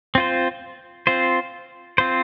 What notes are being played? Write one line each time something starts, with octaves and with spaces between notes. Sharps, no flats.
C4 F4 C5
C4 F4 C5
C4 F4 C5